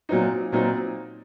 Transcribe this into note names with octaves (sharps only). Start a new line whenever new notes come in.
A#2 F#3 C4 D#4
A#2 F#3 C4 D#4